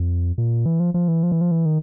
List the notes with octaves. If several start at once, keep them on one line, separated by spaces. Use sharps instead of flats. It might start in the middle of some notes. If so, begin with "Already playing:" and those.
Already playing: F2
A#2
E3
F3
F3
E3
F3
E3
F3
E3
D#3